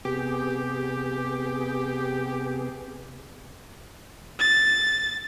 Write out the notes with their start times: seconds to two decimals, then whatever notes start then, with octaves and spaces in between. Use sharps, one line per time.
0.05 C3 B3 G4 G#4
4.39 A6